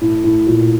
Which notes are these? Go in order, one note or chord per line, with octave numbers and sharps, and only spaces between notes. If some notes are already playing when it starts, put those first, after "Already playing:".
A2
A2
A#2